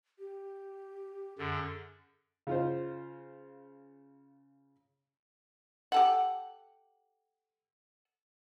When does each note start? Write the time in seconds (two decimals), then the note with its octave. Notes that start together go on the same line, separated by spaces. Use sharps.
0.19 G4
1.38 F#2 D3 G#4
2.47 C#3 F4 C5
5.92 G4 A4 F#5